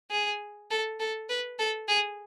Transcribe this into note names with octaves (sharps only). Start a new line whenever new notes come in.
G#4
A4
A4
B4
A4
G#4